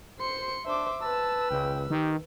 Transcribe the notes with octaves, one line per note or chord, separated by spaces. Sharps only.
C5 C6 C#7
D4 C5 E5 D6
B4 A5 E6
C#2 G5
D#3 G4